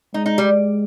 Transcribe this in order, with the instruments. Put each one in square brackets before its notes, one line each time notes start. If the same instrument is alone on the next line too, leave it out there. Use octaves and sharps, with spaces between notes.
[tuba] G#3 [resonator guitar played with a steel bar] D#4
[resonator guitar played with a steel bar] D#4
G3